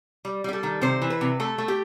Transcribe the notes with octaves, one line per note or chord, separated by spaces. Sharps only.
G3
G3 G4
A4
D#3
C3 C5
E3
B4
C3
A3 A4
A3
G4